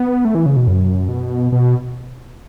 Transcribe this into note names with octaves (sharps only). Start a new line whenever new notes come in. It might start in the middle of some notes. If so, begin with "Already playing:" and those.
Already playing: B3
A3
E3
C#3
B2
F#2
B2
B2